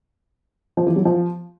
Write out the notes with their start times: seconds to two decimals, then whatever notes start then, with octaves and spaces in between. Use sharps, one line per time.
0.77 F3
0.87 E3
0.96 F#3
1.05 F3